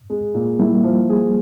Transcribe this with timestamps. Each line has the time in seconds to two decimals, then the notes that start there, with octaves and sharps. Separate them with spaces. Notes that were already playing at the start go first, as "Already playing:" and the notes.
0.10 G#3
0.34 A#2
0.59 G3 A#3 E4
0.84 F3
1.09 G#4